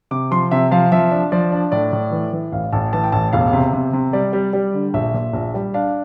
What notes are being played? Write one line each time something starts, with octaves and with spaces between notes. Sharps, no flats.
C3 D6
F3 C6
C3 E5
F3 F5
F3 E5
D4
F3 D5
D4
A2 D5
A2
E3
E3
A1 F5
A1 A5
E3 A5
G5
A1 A5
E1 F5
C3
C3
C3
G3 D5
G3
G3
D3
A#1 E5
A#2
A#1
G3
D4 F5